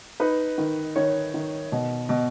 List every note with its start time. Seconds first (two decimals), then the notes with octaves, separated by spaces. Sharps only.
0.20 D#4 B4
0.58 D#3
0.96 D#3 C#5
1.34 D#3
1.72 B2
2.09 B2